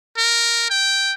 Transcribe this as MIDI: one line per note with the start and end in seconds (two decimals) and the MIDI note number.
0.17 0.67 70
0.70 1.13 79